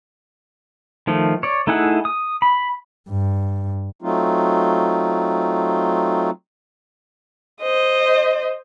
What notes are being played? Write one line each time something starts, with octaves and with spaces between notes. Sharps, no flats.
D#3 F3 A3
C#5 D5
A3 D#4 E4 G#4 F#5
D#6
B5
G2
F#3 A3 C4 D#4 F4
C5 D#5